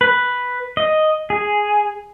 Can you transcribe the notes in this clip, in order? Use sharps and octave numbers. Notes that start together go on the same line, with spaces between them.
B4
D#5
G#4